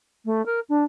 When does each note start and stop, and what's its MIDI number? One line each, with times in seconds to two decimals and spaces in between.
0.25 0.44 57
0.45 0.60 70
0.69 0.84 62